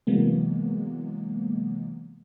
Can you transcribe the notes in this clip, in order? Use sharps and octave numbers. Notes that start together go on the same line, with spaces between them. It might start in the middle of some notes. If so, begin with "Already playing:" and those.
C3 E3 F#3 G#3 A#3 B3